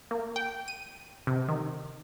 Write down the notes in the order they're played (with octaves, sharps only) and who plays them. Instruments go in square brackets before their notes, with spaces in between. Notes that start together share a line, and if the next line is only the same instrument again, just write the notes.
[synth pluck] A#3
G5
D#7
C3
D#3